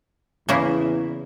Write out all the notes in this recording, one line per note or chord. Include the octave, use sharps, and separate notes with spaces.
E2 C#3 A#3 E4